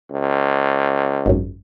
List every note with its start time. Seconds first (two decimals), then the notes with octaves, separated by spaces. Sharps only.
0.11 C#2
1.26 G#1 F#2